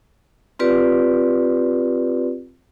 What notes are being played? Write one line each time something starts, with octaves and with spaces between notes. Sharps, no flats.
C4 F4 G4 B4 D5